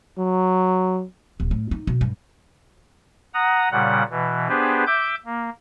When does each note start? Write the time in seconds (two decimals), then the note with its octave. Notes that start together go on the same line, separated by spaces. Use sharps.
0.18 F#3
1.40 D#1
1.51 A2
1.71 D#4
1.87 B2
2.01 G2
3.34 F#5 A#5 D#6
3.71 A#2 C#3 G3 F#5
4.10 B2 E3
4.49 B3 D4 G4 G#4 B4 C5
4.87 E5 D6 G6
5.26 A#3